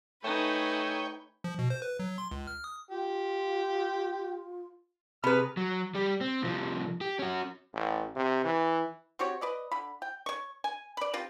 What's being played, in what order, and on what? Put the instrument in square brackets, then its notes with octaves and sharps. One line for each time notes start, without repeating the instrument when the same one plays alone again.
[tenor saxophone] A3 [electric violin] D#4 G#5 [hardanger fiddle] B4 [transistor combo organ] C#5 G5
[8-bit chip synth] F3
B2
C5
B4
F#3
C6
C#2
F6
D#6
[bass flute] F4 [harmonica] G4
[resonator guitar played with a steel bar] C3 B4 [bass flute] G#4 [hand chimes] B5 [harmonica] F6
[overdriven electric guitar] F#3
G3 G4
C4
C2 F3
G4
C#4 F#4
[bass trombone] A1
C3
E3
[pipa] C4 F#4 G4 C#5
B4 D5 D#5
D3 B5
G5
C#5 C#6
G#5
D5 B5
C4 F4 G4